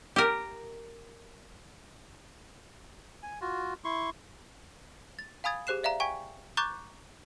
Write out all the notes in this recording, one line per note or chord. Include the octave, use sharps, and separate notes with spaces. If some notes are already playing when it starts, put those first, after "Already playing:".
G4 A#4
G#5
F4 F#4
E4 C6 C#6
A6
F5 G#5 B5 D#6 G#6 A6
G4 G#4 C5 F#6 C7 E7
D5 E5 F5 A#5
G5 G#5 C#6 G#6 B6
A#5 C#6 D6 F#6 G6 A6